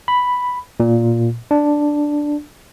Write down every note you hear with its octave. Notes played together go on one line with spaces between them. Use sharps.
B5
A#2
D4